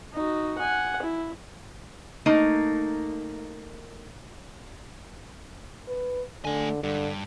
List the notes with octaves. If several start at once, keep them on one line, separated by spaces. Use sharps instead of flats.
D#4 F#4
F#5 G#5
E4
A3 A#3 D#4
B4
D3 A3 G#5
G2 D3